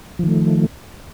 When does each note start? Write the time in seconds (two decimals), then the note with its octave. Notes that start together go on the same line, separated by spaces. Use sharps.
0.19 F3
0.23 D#3
0.27 A3